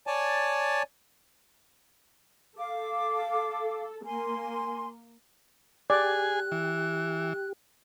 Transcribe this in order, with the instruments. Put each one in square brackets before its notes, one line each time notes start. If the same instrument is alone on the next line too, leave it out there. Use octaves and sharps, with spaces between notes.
[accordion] C#5 D5 G#5 A5
[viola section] A4 [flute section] F5 D6
[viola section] A#3 [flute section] G#5 C6
[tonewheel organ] G4 [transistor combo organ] G#4 G#5 [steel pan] D5 [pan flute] F#6
[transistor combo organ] E3